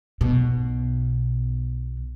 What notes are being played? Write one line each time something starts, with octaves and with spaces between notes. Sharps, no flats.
B1 B2